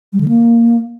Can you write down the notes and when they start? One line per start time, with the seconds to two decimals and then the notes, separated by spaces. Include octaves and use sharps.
0.13 G3
0.21 D3
0.28 A#3